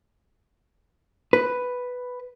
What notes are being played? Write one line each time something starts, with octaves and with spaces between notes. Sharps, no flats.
B4